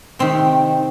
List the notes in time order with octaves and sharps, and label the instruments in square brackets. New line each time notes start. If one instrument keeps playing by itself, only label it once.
[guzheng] C3 D#3 C4